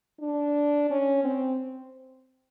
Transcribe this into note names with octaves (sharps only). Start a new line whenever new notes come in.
D4
C#4
C4